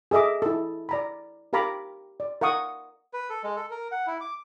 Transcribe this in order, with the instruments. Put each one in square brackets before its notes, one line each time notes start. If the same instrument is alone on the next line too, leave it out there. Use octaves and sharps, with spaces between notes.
[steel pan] G#4 A4 D#5 E5 D6
E4 A4
D5 A#5 B5
G4 A#4 F5 A#5 B5 D6
D5
A#4 F5 F#5 C#6 D#6
[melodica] B4
A4
G#3
A4
A#4
F#5
E4
D6